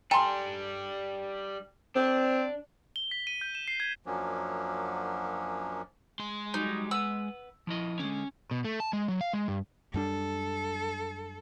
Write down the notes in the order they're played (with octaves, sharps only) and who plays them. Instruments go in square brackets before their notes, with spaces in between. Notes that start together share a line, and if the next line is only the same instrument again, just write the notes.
[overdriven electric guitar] G3 D4 [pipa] A4 C6 [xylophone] G5 G#5 A#5
[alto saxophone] C4 [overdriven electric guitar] D4
[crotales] G7
B6
D#7
G6
E7
C7
G#6
[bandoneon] F#2 F3 F#3 A#3 C#4 D4
[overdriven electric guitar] G#3 C6
[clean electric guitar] F#3 G3 [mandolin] D#4
[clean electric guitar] B4 F#5 [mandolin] E6
[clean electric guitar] F3 E4 D#5
[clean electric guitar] D3 G#3 [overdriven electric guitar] C#4
[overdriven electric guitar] B2
A3
A5
G#3
F#3
F5
G#3
G2
[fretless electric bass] F#2 G3 D4 [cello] A4